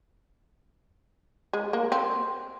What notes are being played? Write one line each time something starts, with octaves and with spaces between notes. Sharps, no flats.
G#3
A#3
C4